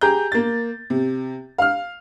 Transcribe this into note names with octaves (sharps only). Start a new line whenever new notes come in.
G4 G#4 A#5 G6
A#3 A6
C3
F5 F6